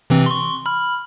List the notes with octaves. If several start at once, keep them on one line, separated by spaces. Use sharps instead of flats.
C3 E3 C4
C6 C#6
B5 F6